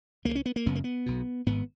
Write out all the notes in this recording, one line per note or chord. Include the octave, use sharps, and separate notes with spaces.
C#2 C#3 A#3
C#4
B3
A#3
F#1 F#2 C#3 B3
A#3
B3
B1 B2
G#1 G#2 B3